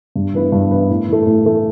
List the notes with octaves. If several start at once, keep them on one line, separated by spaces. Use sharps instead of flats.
G2
E3 B3 E4 B4
G2
E3 B3 E4 B4
A2
E3 A3
A2
E3 A3